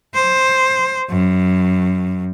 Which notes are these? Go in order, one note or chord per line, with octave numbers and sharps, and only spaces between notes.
C5
F#2